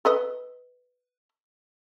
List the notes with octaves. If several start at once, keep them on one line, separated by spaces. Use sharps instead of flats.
A4 B4 D#5